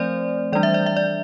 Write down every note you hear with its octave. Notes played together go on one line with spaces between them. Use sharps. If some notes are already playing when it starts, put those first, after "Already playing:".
Already playing: F3 A3 C4 C5 D5
E3 G3 D4 D5
E5
D5
E5
D5